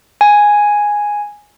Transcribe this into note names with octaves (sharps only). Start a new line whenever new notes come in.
G#5